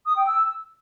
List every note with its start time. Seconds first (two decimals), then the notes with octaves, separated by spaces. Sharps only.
0.05 D#6
0.16 G5
0.26 E6